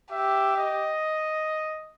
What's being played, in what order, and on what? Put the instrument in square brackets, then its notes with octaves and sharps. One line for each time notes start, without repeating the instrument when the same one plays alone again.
[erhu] G4 [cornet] E5
[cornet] D#5